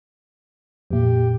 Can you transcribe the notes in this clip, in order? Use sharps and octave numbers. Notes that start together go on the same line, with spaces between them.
F2 A#2 G4